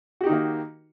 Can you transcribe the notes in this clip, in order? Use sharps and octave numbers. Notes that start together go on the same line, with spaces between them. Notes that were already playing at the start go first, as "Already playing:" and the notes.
D#3 A#3 D#4 F#4 G4